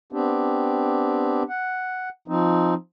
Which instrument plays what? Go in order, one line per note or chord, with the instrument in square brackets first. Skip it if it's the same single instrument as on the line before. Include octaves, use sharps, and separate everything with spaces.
[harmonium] B3 C4 D4 G4
F#5
F3 C4 D#4